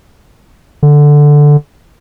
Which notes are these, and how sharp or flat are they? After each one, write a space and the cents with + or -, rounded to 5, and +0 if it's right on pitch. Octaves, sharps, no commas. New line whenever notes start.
D3 +0